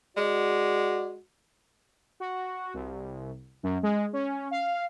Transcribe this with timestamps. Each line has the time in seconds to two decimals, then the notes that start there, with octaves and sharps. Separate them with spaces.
0.17 G#3 F#4 D5
2.20 F#4
2.74 C2
3.63 F#2
3.83 G#3
4.13 C#4
4.51 F5